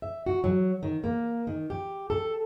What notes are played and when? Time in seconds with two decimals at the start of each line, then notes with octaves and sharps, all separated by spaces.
0.02 E5
0.26 F#4
0.44 F#3
0.83 D#3
1.04 A#3
1.47 D#3
1.70 G4
2.10 A4